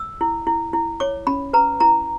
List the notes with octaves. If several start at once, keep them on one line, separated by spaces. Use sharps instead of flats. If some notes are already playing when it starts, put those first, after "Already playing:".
Already playing: E6
E4
E4
E4
C#5 D6
C#4 B5
B4 A#5
E4 A#5